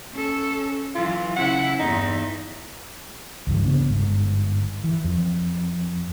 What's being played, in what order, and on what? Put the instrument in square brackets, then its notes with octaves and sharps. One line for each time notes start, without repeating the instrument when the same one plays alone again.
[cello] C#4 A4
[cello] E3 F#3 [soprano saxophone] F4
[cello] C#3 E4 [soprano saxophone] F#5
[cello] E2 G2 [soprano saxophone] D#4
[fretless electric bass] C#2 G2 E3
C#3 B3 D4
G1 G#2
E3
F2